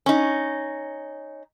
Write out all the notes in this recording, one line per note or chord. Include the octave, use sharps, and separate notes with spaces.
C#4 D#4